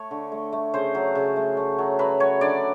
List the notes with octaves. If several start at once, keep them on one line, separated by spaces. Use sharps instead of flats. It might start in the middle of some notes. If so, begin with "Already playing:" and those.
Already playing: A3 C#5
D3
A3
A3
C#3 C5
F#3
C#3
A3
A3
F#3
F#3 B4
F#3 C#5
D3 D5